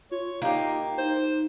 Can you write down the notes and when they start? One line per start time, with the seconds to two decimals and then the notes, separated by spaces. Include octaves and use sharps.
0.11 F4 C#5
0.42 A#3 D#4 G4
0.98 D#4 C5